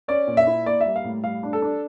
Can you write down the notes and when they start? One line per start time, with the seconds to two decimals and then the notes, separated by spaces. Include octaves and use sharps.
0.08 C#4 D5
0.27 A#2
0.37 E5
0.47 E4
0.66 A#3 D5
0.81 G3 E5
0.96 F5
1.04 A2
1.24 G3 F5
1.43 D4
1.53 A4
1.62 D4